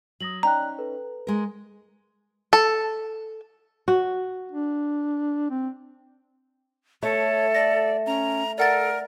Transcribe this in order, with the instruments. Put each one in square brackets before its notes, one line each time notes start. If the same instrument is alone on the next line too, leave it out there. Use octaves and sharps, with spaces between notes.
[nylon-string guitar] F#3 [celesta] D#6 A#6 F#7
[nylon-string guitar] C#4 D#4 [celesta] D5 G5 F#6 [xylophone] A#5
[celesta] A4 B4
[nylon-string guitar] G#3 A#4
[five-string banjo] A4
[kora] F#4
[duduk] D4
C4
[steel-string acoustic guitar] A3 [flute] A4 [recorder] C#5
[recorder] D5 [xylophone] A#6
[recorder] C#4 [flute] A#5
[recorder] A4 [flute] A#4 [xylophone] D5 F#5 A6